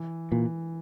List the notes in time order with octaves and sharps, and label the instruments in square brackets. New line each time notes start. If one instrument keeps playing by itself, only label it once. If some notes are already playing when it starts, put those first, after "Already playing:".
Already playing: [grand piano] E3
[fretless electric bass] A#2 [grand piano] E3